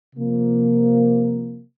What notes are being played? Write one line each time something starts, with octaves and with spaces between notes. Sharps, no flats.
C3 F3 A#3